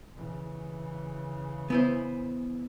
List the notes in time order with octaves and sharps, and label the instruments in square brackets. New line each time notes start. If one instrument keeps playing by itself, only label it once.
[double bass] C#3 E3
[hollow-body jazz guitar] B3 E4 C5